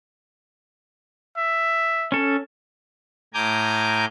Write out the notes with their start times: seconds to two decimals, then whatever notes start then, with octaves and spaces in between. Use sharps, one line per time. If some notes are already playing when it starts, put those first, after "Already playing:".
1.37 E5
2.12 C#4 A4
3.34 A2 G#5 A#5 D6 G6